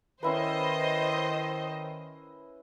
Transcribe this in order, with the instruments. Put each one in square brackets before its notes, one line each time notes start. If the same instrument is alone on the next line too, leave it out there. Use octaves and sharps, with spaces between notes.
[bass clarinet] D#3 [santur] C#4 E4 B4 [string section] C5 D#5